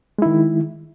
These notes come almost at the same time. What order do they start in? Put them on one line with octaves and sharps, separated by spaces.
G#3 E4 D#3